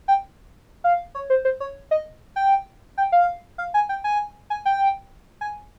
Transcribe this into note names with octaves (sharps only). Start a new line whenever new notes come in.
G5
F5
C#5
C5
C5
C#5
D#5
G5
G5
F5
F5
G#5
G5
G#5
G#5
G5
G#5